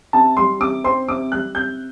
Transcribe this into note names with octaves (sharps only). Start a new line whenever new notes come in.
C3 A5
G3 C6
C3 D6
C4 C6
C3 D6
G3 F#6
C3 G6